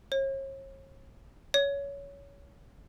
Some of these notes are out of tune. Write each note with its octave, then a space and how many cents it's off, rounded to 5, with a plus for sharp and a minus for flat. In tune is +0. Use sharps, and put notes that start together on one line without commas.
C#5 -40
C#5 +20